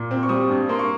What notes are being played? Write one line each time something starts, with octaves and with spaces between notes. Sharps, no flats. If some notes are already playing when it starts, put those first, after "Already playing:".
Already playing: A#2
C4
C#6
G3 D#6
G2
A#3 C6
C#6